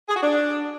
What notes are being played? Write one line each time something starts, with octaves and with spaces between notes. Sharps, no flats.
G#4
F#4
D4